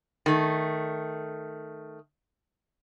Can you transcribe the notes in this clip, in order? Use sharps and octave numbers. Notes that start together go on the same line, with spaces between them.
D#3 A3